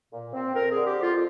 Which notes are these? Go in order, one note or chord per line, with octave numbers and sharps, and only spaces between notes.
A#2
C4
F2 A#4
D3 G#4
G4
F2
F4